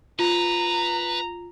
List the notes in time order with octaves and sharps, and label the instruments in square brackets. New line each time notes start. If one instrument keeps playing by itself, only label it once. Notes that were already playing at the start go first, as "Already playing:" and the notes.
[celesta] F4 [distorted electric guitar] B4 [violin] A#5